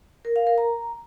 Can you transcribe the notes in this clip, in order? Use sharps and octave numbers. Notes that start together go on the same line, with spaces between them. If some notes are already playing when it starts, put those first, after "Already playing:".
A#4
F5
A#4
A#5